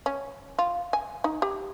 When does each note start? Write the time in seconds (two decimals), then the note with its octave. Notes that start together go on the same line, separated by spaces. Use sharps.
0.06 C#4
0.59 F4
0.93 G#5
1.24 D#4
1.42 G4